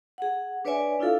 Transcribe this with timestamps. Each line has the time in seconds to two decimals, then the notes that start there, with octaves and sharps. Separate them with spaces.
0.18 G#4 F#5
0.65 D4 B4 C#5 D5 E5 G#5
0.99 D4 E4 F4 A4 F5